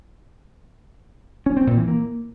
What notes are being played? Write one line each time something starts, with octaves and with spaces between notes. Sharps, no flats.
C#4
C4
A#2
E3
A#3